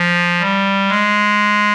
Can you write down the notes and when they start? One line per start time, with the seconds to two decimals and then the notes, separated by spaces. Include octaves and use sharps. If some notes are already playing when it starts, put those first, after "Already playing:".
Already playing: F3
0.40 G3
0.88 G#3